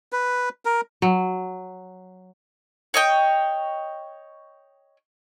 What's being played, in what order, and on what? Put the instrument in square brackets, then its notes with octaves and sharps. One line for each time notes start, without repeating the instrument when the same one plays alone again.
[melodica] B4
A#4
[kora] F#3
[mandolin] C#5 D#5 G5